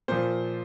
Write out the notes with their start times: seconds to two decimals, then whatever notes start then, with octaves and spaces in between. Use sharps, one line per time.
0.08 A#2 F3 C5